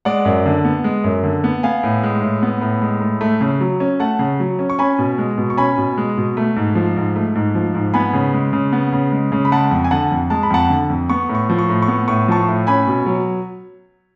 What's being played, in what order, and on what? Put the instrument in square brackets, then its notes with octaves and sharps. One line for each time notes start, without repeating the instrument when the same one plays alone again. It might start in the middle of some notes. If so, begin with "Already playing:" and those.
[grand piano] G#3 D5 F#5
F#2
D3
B3
G#3
F#2
D3
B3
B3 F5 G#5
A2
G#3
A2
B3
A2
G#3
A2
A3
C#3
F#3
C#4
A3 F#5 A5
C#3
F#3
C#4
C#6
C#4 G#5 B5
B2
G#3
B2
C#6
C#4 G#5 B5
B2
G#3
B2
A3
G#2
F3
G#2
A3
G#2
F3
G#2
B3 G#5 B5
C#3
G#3
C#3
B3
C#3
G#3
C#3
B5
G#3 F#5 A5
F2
G#5
D3 F#5 A5
F2
G#3 A5
B5
F2 F#5 A5
D3
F2
B3 C#6
A2
C#6
F3
C#6
A2
C#6
B3
A2 C#6
F3 A5 C#6
A2
C#4 G#5 B5
B2
F#3